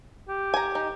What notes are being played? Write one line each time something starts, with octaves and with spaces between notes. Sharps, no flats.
G4
G#5 A#5
D#4